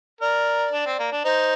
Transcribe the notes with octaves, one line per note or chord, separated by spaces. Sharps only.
A#4 D5
D4
C4
A#3
D4
D#4 C5